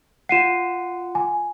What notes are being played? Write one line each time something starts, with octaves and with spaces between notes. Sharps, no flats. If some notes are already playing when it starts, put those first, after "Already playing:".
F4 F#5 C7 D#7 E7
G#5